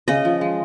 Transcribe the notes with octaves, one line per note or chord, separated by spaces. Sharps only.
C#3 D#5
F3
G#3